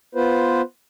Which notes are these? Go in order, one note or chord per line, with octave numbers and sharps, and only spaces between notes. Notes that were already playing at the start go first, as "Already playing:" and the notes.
B3 F4 B4 C5